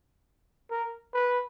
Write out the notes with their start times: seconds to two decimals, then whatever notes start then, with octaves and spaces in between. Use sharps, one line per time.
0.71 A#4
1.14 B4